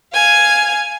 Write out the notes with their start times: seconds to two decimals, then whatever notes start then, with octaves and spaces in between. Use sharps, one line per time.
0.14 F5 G#5